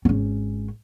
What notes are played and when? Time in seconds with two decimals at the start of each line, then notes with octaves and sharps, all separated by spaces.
0.05 G#1 C#4